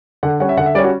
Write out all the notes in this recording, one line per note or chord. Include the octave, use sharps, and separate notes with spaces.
D3 F#5
G3 C#4 F#5
E5
D3 F#5
E5
G3 C#4 D5
F#4